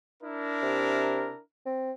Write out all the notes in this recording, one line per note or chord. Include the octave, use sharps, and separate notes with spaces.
D4 E4 A#4
C3
C4